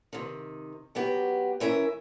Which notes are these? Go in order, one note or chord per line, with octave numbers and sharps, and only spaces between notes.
C3 D#3
F#3 B3 G4
E3 C#4 A#4 E5